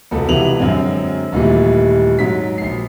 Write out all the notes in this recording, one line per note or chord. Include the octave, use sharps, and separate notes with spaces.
E1 C#2 B3 A4
F1 C3 E3 B3 F7 F#7
F#2 D3 F#3 G#3 C4
D#1 A#2 E3 G3 A3
G#2 F#3 B6
A#1 C7